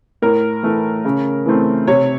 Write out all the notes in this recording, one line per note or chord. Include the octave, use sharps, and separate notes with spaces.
A2 A#4
E3 A3
C#3
E3 A3 C4
C3 C#5